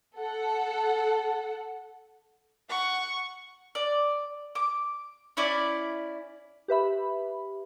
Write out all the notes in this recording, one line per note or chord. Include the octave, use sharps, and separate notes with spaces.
A4 F#5
F#5 C#6
D5
D6
C#4 E4 D5
G4 B4 E5 B5